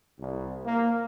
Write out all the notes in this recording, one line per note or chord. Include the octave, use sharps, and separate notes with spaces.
C2
A#3